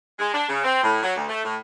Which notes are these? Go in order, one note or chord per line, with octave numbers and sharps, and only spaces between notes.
G#3
D4
C#3
C4
A2
F#3
D2
A3
A2